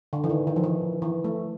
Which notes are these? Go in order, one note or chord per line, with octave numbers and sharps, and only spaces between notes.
D3
E3
D#3
D#3
F3
E3
E3
A3